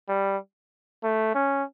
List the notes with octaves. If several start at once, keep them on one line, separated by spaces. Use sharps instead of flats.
G3
A3
C#4